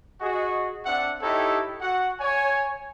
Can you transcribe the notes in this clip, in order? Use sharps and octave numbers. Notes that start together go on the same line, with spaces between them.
F#4 G#4 D#5
C4 D4 E5 F#5
D#4 E4 G4 A4 C#5 D#5
F#4 F#5
C#5 G#5